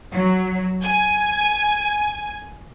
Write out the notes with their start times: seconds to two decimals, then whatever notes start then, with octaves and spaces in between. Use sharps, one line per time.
0.12 F#3
0.82 G#5